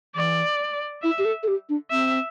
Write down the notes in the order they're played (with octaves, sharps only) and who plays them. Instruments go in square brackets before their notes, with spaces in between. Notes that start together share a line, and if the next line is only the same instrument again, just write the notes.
[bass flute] E3 [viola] D5
[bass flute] E4 [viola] E5
[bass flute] G4
A4
A4
G4
D4
[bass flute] C4 [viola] E5